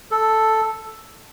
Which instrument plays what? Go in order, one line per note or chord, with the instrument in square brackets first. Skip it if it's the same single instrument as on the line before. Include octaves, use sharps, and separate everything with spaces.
[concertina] A4